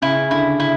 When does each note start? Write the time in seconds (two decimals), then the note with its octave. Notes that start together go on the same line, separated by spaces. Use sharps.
0.02 C#3 E4
0.31 D3 E4
0.59 C#3 E4